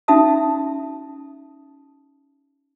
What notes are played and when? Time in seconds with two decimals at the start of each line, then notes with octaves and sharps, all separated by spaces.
0.08 C#4 D#4 F#4 E5 A5 D#6